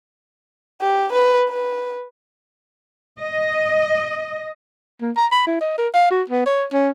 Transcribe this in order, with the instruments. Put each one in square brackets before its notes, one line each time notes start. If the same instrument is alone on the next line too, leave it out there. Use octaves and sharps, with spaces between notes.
[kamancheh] G4
B4
B4
[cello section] D#5
[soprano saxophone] A#3
A#5
B5
E4
D#5
A#4
F5
F#4
B3
C#5
C#4